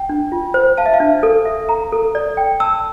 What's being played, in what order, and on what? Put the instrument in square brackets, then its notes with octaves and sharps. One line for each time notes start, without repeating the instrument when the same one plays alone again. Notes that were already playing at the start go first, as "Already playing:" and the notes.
Already playing: [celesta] G5
[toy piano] D4
F4
C5
[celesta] F5 [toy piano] A5
[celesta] E5
F5
[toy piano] D4
A4
E5
A#5
A4
D5
G5
[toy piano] A5 [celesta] E6